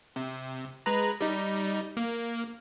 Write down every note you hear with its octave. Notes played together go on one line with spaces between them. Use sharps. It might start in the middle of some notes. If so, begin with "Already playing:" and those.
C3
G#3 B4 A#5
G3 D#4
A#3